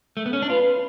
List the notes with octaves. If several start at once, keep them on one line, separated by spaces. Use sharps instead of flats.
A3
B3
C#4
D4
F4 B4